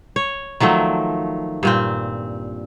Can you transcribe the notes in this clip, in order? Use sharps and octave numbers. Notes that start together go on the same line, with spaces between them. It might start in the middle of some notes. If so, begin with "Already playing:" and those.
C#5
D#3 F3 F#3 A3
G2 A#2 C4